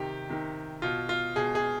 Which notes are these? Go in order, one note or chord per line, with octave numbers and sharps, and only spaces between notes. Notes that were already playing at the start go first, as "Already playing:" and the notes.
Already playing: C3 D#3 G4
C3 D#3
B2 F4
F4
B2 G#4
G#4